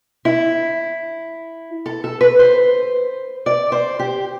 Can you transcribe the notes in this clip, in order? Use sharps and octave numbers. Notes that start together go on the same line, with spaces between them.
E4
A4
A4
B4
C5
D5
C5
G4